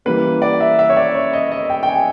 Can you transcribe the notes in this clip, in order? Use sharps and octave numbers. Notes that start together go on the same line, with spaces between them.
E3 G3 A#3 C#4 B4
D5
E5
E5
C#5
D5
C#5
D#5
D#5
G5
G5
G#5